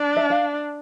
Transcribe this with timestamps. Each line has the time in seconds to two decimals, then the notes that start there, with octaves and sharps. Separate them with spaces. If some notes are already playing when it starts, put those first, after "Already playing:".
Already playing: D4
0.17 E5
0.30 F5